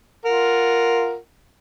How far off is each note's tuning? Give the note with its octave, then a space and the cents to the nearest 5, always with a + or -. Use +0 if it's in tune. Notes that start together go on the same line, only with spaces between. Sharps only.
F4 +0 A#4 +0 F#5 +0